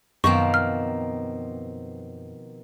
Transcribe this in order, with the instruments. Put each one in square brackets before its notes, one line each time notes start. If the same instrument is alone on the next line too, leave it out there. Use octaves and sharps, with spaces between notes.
[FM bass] F#2 [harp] B2 F3 [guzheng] D#3 A#3 C4 [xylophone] C#6
[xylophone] F6